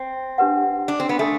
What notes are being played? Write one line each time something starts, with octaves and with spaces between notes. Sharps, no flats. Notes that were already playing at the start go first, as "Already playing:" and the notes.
Already playing: C4
D4 G4 B4 F#5
D4
C4
B3
A3 D4 A4